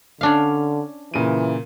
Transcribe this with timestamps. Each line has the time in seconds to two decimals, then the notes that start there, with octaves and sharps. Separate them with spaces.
0.21 D3 C#4 D4 F5
1.14 A#2 C#3 E3 D#7